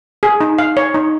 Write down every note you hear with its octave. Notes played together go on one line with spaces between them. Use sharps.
G#4
D#4
F5
C#5
D#4